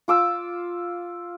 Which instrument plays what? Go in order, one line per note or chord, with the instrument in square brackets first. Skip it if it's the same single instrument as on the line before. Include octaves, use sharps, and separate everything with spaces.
[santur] F4 D6 E6